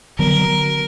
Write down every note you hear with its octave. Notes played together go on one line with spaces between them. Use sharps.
D3 F#3 B3 A#4